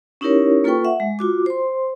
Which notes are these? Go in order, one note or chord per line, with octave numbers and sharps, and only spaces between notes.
C#4 D#4 E4 G4 A#4 C#5
A#3 F4 A4 B4 G5 C#6
E5 F#5
G#3
F4 F#4 D6
C5 C6